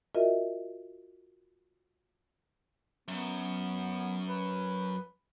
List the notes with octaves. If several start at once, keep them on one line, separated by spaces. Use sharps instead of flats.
F4 F#4 A#4 D#5 E5
F#2 B3
B4